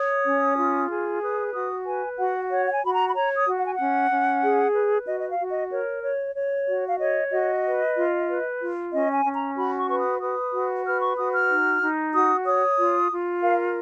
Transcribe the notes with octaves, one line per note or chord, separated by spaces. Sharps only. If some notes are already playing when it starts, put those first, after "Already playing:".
Already playing: C#5 D#6
C#4
F4
G#4
B4 D#6
F#4 D#6
B4 G#5
F#4 F#5
C#5 F#5
F#5
G#5
F#4 B5
A#5
B5
C#5 A#5
D#6
F#4
F#5
G#5
F#5
C#4
C#4
G#4
B4
F#4 D#5
D#5
F5
F#4
D#5
A#4 C#5
C#5
C#5
F#4
F5
C#5 D#5
F#4 D#5
B4
F4
B4
F4
C#4 D#5
G#5
C#4
A#5
F#4 B5
C#6
B4 C#6
D#6
B4 D#6
F#4
B4 F6
C#6
F#4 D#6
F6
D#4
D#4
F#4 D#6
C#5 D#6
F4
F4
A#4 F5